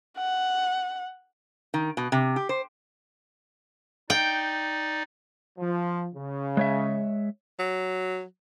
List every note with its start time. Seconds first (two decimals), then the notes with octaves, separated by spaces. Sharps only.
0.18 F#5
1.74 D#3
1.97 B2
2.12 C3
2.36 G4
2.49 C5
4.10 D#4 D5 G5
5.59 F3
6.14 C#3
6.57 G#3 C#5 E5
7.59 F#3